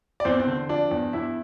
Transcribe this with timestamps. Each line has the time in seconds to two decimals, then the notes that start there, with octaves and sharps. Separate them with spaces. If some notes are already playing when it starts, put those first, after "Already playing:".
0.20 D5
0.25 E2 C4 C5
0.40 C4 C5
0.47 D3
0.69 F3 D4 D5
0.91 E2
1.13 E2 E4 E5